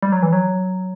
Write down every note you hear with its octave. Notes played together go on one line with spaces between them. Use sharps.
G3
F#3
E3
F#3